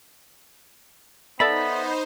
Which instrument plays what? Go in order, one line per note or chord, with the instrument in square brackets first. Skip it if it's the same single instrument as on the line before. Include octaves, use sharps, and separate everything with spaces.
[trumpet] B3 [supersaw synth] D#4 C5 [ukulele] A4 D5 E5 [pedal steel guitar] B5